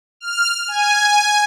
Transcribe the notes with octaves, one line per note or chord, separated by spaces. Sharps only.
F6
G#5